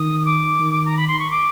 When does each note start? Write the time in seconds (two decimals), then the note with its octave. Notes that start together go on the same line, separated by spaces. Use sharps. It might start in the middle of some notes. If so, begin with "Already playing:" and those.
Already playing: D#3 D#6
0.25 D6
0.60 D#3
0.85 A#5
0.96 B5
1.07 C6
1.19 C#6
1.30 D6